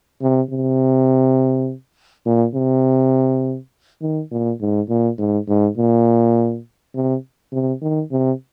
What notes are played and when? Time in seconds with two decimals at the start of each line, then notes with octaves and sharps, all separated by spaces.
0.22 C3
0.50 C3
2.26 A#2
2.55 C3
4.02 D#3
4.32 A#2
4.61 G#2
4.89 A#2
5.18 G#2
5.48 G#2
5.77 A#2
6.95 C3
7.53 C3
7.82 D#3
8.11 C3